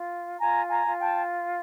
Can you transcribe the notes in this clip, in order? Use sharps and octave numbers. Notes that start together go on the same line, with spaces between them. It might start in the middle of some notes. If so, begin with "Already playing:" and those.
Already playing: F4
F4 G#5 A#5
G#5 A#5
F4
G5 A5